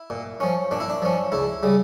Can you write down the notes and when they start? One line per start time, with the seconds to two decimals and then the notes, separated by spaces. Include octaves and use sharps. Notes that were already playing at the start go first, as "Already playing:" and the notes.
Already playing: E4
0.10 A#2
0.40 F3 C#4
0.71 A#2 D4
0.80 E4
0.90 D4
1.02 F3 C#4
1.32 C#2 E4
1.63 C#3 G3